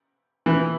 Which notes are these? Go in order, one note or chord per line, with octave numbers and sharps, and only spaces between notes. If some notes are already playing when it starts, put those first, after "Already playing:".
E3